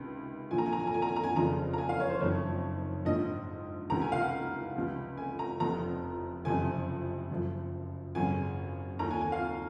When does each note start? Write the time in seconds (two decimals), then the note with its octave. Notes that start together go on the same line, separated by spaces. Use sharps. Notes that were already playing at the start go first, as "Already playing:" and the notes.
Already playing: C#2 C3 D#3
0.51 A#1 A#2 F3 G#5
0.58 A#5
0.66 G#5
0.73 A#5
0.80 G#5
0.87 A#5
0.94 G#5
1.02 A#5
1.09 G#5
1.16 A#5
1.24 G#5
1.35 F1 F2 C#3 F3 A#5
1.73 A#5
1.78 G#5
1.89 F5
2.00 C#5
2.10 C5
2.20 F#1 F2 D#3 C#5
3.05 A#1 G#2 F3 D#5
3.90 C#2 C3 D#3 A#5
4.02 G#5
4.12 F5
4.22 F#5
4.75 C#2 C3 F3
5.17 G#5
5.39 A#5
5.60 F1 F2 C3 A#5
6.45 F#1 F2 C3 F3 G#5
7.30 F#1 F#2 F3
8.15 G#1 F#2 C#3 G#5
8.99 D#2 D#3 A#5
9.11 G#5
9.21 G#5
9.32 F5